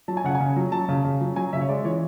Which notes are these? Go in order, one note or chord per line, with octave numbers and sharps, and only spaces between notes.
F#3 A5
G#5
C#3 F#5
G#5
C#3
F#3
F#3 A5
C#3
C#3
F#3
F#3 G#5
C#3 E5
C#5
G#3 D5
E3 C#5